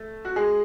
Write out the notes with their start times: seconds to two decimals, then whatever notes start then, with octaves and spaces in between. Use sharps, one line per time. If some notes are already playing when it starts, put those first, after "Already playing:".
Already playing: A3 A4
0.25 F#4
0.36 G#3 G#4